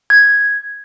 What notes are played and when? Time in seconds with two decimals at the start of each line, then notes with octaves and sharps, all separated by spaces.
0.10 G#6